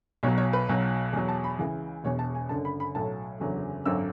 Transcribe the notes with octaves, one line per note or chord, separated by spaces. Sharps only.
B1 B2 F#3 C#5
C#5
B4
B1 B2 F#3
E2 B2 F#3
A5
B5
C#2 C#3 E3
E1 E2 B2 C#5
A5
G#5
F#1 F#2 D3 A5
B5
B5
B1 A2 F#3 A5
F#1 E2 D3 F#3
G#1 F#2 D3 F#3 E6